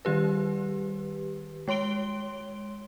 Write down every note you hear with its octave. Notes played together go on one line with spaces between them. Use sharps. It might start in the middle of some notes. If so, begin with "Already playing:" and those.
D#3 G3 G4 B4
G#3 C#5 C6 D7 G7